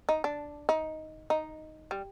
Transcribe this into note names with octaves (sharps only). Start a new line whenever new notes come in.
D#4
D4
D#4
D#4
G3